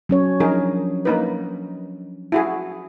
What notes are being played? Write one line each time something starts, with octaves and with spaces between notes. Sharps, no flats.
F#3 C#4 C#5
F3 D4 D#4 G#4 A#4
A#3 D#4 B4
E4 F#4 G#4